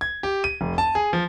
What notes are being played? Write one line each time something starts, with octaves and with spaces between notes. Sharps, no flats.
G#6
G4
D#7
F1
A5
G#4
F3